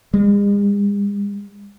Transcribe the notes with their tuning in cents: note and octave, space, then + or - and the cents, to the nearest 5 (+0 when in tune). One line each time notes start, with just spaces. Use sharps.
G#3 -45